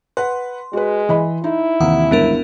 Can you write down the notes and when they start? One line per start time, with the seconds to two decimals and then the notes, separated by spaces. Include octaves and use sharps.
0.17 B4 F#5 C6
0.73 G#3 F#4 B4
1.09 E3 D#5 B5
1.44 D#4 E4
1.80 D#2 C3 D#3 E3 F#5
2.11 G1 C#2 B3 D4 A#4